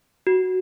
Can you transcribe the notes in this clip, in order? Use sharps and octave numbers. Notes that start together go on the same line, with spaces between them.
F#4